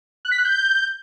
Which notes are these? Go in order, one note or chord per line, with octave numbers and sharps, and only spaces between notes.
F#6
B6
F#6
G6